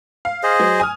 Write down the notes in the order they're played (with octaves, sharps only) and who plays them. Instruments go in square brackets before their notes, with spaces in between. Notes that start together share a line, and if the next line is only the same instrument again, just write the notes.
[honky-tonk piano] F5
[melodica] G#4 C5 D#5
[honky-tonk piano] F#3
G#5 D#6 F6